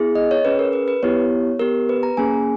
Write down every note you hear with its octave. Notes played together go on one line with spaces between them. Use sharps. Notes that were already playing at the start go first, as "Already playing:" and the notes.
Already playing: B3 E4 G#4
D#5
C#5
C#4 G#4 B4
A#4
B4
B4
B3 E4 G4 C#5
B3 G4 A#4
B4
A#5
A#3 C#4 G#4 G#5